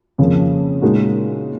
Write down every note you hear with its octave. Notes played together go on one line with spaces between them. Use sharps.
F2 C#3 F3 A#3
A#2 G#3 D#4 F#4